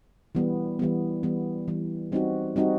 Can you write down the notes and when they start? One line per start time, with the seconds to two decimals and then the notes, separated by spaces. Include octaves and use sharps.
0.35 E3 G3 B3
0.79 E3 G3 B3
1.23 E3 G3 B3
1.68 E3 G3 B3
2.12 G3 C4 D#4 F#4
2.56 G3 C4 D#4 F#4